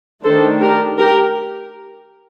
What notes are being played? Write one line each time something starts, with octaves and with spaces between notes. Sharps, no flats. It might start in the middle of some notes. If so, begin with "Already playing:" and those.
D#3 A3 D4 A4 C5
G4 A#4
G4 A#4